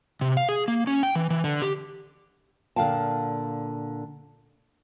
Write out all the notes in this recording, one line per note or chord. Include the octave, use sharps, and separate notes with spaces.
C3
F5
G#4
A#3
C#4
G5
E3
E3
D3
G4
A#2 D3 F5 G5 A5